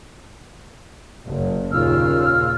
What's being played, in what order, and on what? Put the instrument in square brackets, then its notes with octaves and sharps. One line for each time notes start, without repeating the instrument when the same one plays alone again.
[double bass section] F#1
[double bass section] D#2 A#2 C#3 [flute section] F4 E6 F6